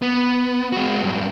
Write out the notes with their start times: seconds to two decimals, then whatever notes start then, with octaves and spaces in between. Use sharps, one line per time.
0.02 B3
0.72 G#3 F#4
1.02 G2 F#3